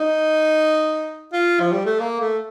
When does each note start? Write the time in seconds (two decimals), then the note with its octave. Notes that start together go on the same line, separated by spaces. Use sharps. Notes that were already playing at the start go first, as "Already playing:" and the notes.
Already playing: D#4
1.33 F4
1.60 F3
1.72 G3
1.85 A3
1.99 A#3
2.21 A3